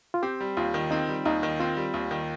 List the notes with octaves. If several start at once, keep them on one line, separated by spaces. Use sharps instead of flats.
F4
C4 G4
G3
D#2 F4
D#3
C4 D#4
G3
D#2 D#4
D#3
C4 F4
G3
D#2
D#3